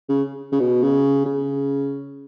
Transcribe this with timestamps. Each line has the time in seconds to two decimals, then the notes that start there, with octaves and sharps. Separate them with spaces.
0.09 C#3
0.52 C#3
0.60 B2
0.83 C#3
1.26 C#3